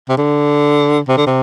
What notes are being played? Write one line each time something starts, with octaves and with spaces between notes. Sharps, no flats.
C3
D3
C3
D3
C3